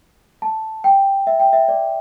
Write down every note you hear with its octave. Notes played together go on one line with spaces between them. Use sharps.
A5
G5
E5
G5
E5
D5